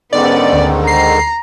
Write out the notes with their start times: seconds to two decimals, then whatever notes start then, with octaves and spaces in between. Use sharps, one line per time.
0.13 G#2 D3 D#3 B3 C#4 D5
0.53 D2
0.87 A#5 C7